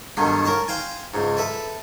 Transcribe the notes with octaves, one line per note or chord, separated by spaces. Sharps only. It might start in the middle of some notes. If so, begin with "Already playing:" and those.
G2 B2 D3 D#3 F#3
A#4 C#5 A5
C5 F5 G5 G#5
C#2 G#2
A4 B4 E5